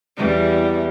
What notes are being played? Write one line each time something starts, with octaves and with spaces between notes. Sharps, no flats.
E2 G3